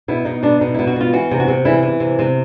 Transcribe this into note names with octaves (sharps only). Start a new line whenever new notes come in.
B2 E4
B2 D#4
B2 D4
B2 D#4
B2 E4
F#4
B2 F4
E3 F#4
C3
F#4
C3
E3 E4
E3
C3
C3